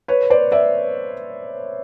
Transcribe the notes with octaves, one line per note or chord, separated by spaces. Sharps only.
B4 C#5
C5 D5
D5 E5